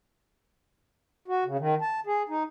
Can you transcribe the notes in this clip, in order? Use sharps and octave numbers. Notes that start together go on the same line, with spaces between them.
F#4
C#3
D#3
A5
G#4
D#4